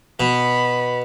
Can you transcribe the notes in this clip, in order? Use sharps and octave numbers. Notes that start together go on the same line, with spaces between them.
B2 B5